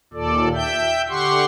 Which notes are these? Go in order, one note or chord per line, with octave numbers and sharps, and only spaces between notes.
D#2 A#2 A4 D5
E5 G5 G6
D3 G4 F#5 C6 C#6